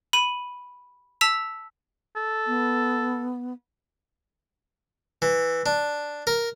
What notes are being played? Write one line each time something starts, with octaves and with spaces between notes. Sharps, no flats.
B5 D#7
A5 E6 B6 F7
A4
B3
E3
D4
A#4